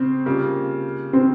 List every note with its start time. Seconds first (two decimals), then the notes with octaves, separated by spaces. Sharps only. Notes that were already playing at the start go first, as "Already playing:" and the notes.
Already playing: C#3 C4
0.26 C#3 G3 A#3 F4
1.13 C4